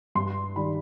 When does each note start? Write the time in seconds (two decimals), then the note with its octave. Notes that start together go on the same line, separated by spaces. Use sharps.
0.15 G2 C6
0.56 D#3 G3 B5